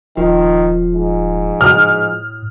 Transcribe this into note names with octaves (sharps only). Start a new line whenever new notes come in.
D#1 D#3 F3
G#2
A2 F6